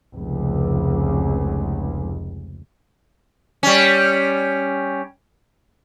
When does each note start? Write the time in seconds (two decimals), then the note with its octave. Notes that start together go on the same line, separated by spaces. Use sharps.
0.13 F1 C#2
3.63 G3 C#4